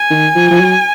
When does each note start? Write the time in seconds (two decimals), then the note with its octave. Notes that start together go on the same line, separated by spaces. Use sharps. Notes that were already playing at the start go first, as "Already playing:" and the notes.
Already playing: G#5
0.10 D#3
0.35 F3
0.51 F3
0.60 F#3